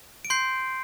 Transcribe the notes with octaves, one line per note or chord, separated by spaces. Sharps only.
D7
C6 G6 C7